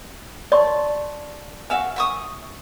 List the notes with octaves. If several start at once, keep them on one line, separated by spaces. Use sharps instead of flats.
D5 A5 C6 C#6
F#4 E5 F5 G#5
E5 C#6 D#6